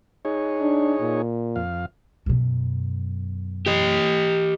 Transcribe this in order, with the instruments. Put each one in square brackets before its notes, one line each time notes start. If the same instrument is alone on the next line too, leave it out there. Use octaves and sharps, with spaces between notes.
[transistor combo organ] D#4 G#4 C#5
[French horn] D4
A#2
[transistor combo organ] F2 F5
[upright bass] F#2 B2
[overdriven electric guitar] G4 D#5